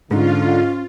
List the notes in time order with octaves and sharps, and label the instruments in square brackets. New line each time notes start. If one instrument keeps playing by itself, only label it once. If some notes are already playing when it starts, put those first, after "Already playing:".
[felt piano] G#2 [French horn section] D3 [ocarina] C#4 [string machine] F4